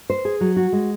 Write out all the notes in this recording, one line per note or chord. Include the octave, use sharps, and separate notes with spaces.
C5
G#4
F#3
F#4
G#3